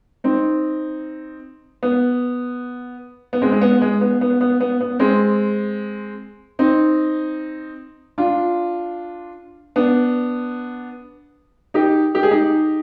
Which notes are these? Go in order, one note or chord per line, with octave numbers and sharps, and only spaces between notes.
C4 D#4
B3
B3
G#3 C4
G#3
B3
G#3
B3
B3
B3
B3
B3
G#3 C4
C4 D#4
D4 F4
B3 D4
D#4 G4
G4
G#4
D#4 G4